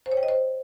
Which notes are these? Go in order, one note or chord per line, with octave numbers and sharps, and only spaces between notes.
C5
C#5
G5
D#5
C5